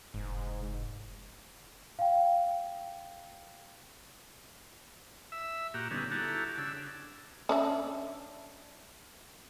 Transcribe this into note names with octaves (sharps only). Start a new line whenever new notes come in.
F1 G#2
F5 G5
E5 E6
A#2 F#4 G4 A#5
D3 G3 B3 C#4 D#4
E4 F#4 G4 A4 A5 A#5
C#3 D4 E6
C#4 D4 E5